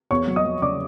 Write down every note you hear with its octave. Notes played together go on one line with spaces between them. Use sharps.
E2 C#5 C#6
F#3
D#5 D#6
F#3
C#3 D5 D6